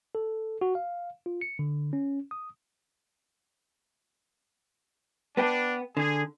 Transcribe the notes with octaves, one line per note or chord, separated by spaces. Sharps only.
A4
F#4
F5
F4
C#7
D3
C#4
D#6
B3 D4 B4 G5
D3 G#4